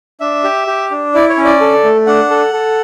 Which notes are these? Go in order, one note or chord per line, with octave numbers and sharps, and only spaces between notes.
D4 E5
G4
G4
D4
E4 D5
C#5
C#4
D5
A4
A3
D4 F#5
A4
A4